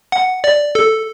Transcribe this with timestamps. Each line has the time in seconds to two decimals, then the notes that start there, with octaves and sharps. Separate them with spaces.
0.12 F#5
0.44 D5
0.75 A4